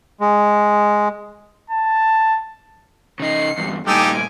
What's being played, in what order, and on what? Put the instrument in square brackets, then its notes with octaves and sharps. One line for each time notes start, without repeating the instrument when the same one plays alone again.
[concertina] G#3
[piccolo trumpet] A5
[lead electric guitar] C#3 D#4 [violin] C7 C#7
[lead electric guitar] E2 G2
[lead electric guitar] G2 A#2 [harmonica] D#4 G4 A4 [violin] G#5 D7